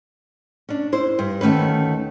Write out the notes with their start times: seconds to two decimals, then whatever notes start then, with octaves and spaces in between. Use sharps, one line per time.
0.69 C#4 D4
0.92 E4 C5
1.19 G2
1.41 D2 D#3 A3 C#4 B4